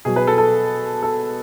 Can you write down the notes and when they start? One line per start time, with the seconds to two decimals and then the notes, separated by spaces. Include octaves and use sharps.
0.05 B2 F#3 G#4
0.16 B4
0.27 A4
0.38 A4
1.03 A4